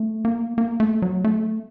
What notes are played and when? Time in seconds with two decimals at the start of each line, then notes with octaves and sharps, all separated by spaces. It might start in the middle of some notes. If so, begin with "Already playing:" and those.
Already playing: A3
0.25 A#3
0.58 A#3
0.80 A3
1.02 F#3
1.24 A3